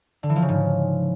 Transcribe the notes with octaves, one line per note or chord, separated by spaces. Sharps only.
D3
E3
F3
C#3
G#2